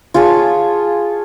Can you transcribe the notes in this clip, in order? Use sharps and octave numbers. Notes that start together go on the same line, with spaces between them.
F4 G#4 C#5 A5